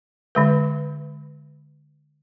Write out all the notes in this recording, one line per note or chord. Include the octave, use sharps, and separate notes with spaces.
D3 G#3 B4